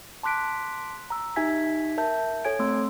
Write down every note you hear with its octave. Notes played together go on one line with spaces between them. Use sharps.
A5 C6 D6 F#6 B6 D7
A#5 E6
D#4 G4 E5 G#5 G#6 B6
A#4 E5 A5 G6
A4 C#5 G#5 G#6 D7
A3 C4 C6 E6